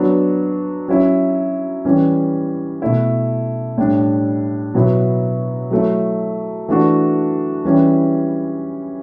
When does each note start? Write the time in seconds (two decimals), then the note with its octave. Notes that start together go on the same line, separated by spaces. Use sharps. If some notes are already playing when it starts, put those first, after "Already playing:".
Already playing: F#3 B3 D4
0.88 F#3 C#4 E4
1.85 E3 G3 C#4
2.82 B2 A3 E4
3.77 A2 G3 D4
4.74 B2 F#3 B3 E4
5.71 F#3 A3 E4
6.68 E3 A3 D4 F#4
7.65 E3 G3 C#4 E4